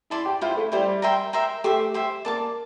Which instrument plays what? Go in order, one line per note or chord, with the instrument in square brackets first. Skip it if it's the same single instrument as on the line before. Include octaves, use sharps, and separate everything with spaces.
[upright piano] E4 [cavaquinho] D5 A5 C6
[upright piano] G4
[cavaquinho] E4 G4 C5 [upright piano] F4
[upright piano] A3
[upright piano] G3 [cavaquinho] E4 G4 C5
[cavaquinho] A#4 E5 G5 C6
A#4 E5 G5 C6
[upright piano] A3 [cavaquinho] G4 C5 E5
[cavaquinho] G4 C5 E5
[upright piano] A#3 [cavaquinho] D5 A5 D6